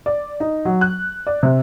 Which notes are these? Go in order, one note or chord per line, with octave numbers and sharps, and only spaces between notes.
D5
D#4
F#3
F#6
D5
C3